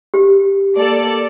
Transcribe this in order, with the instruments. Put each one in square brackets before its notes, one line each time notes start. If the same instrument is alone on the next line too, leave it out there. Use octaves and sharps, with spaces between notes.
[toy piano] G4
[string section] A#3 A4 D5